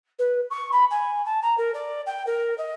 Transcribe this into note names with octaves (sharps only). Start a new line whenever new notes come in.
B4
C#6
B5
G#5
A5
A#5
A#4
D5
G5
A#4
D#5